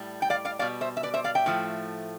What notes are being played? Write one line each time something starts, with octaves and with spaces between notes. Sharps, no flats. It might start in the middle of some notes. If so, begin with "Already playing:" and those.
Already playing: A2 G3
G5
D5 F5
D5 F5
B2 G3 D5 F5
C5 E5
E5
B4 D5
C5 E5
D5 F5
E5 G5
A2 F3 A3